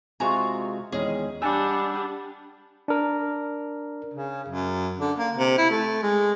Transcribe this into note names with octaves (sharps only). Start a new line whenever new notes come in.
C3 G#3 F4 F#4 G#5 A#5
E2 D#3 G#3 C#4 G#4
G3 D4 F#5 G#5 A5 E6
D4 A#4
C#3
F#2
D3
A#3
C3
E4
A3
G#3